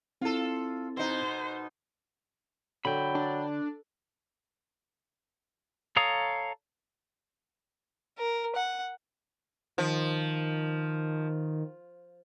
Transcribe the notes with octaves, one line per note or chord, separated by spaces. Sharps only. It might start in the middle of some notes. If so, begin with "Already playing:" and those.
C4 E4 F4 A4
B2 D#4 C5
D3 F#3 G5 B5
D4
A4 C#5 F5 A#5 D#6
A#4
F#5
D#3 F3